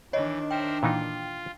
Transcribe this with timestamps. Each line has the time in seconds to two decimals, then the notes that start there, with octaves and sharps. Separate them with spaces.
0.13 D#3 E3 D4 C#5 D#5
0.51 A#4 C5 E5 G5
0.83 A#2 E3 D#4 F4